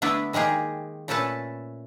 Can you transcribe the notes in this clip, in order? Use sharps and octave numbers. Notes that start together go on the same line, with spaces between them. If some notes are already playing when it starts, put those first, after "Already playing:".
D3 A3 B3 D4 E4 B4
D#3 G#3 A#3 G4 G#4
A#2 A3 C#4 A4 B4 A5